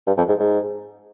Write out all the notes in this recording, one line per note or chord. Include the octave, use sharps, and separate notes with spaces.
G2
F2
G#2
G#2